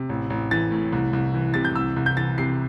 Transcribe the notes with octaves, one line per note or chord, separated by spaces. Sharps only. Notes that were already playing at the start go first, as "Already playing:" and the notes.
Already playing: C3
A1
A1
E3 A6
A2
C2
C2
E3
C3 A6
G6
C2 E6
C2
G6
E3 A6
C3 C7